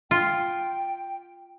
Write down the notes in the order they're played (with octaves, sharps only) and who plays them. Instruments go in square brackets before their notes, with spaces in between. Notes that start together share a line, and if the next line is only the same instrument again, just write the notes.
[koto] F4 [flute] G5